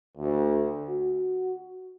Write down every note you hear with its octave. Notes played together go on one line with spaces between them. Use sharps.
D2
F#4